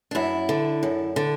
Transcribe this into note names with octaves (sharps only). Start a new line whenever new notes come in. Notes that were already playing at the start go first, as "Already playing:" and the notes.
D4
F#2 E4
D3
F#2
D3